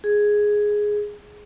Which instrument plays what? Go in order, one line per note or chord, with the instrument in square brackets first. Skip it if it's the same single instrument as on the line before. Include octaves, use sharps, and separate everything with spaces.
[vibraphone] G#4